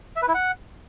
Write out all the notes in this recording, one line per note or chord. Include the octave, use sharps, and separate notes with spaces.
E5
B4
E4
F#5